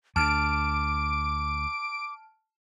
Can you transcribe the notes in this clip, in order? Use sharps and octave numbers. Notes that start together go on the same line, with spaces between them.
D2 A5 D6 F6 D7